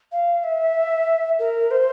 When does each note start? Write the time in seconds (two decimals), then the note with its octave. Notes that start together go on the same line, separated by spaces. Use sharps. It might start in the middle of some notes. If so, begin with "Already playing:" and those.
0.12 F5
0.44 E5
1.39 A#4
1.71 C5